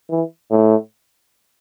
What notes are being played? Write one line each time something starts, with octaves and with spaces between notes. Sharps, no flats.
E3
A2